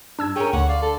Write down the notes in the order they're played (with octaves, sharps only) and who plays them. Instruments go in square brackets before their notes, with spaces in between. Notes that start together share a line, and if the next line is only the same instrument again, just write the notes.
[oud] G2 [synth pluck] D4 E6 G#6
[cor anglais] C#4 [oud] G#4 A#4 [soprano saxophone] G5
[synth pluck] D2 [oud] D3 [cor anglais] C#5 [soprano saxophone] F#5
[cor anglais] D5 [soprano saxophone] F5
[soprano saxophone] A4